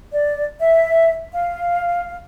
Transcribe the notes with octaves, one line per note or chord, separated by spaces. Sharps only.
D5
E5
F5